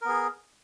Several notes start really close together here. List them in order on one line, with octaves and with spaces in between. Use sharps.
A#4 B3 G#4